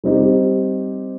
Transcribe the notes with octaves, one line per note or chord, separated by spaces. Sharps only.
G3 C4 D#4 G4